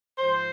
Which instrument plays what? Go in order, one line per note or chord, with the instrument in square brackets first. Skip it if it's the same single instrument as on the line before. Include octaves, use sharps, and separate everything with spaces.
[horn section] G#2 F3 C5